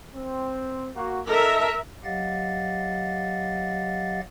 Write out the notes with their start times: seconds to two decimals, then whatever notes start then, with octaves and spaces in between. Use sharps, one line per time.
0.14 C4
0.96 A#3 F#4
1.29 D#4 A4 A#4 E5
2.04 F#3 G4 D#5 F5 F#5 A6